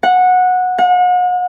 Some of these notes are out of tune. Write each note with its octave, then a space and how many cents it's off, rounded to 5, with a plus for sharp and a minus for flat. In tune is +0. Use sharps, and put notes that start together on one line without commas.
F#5 -15
F#5 -40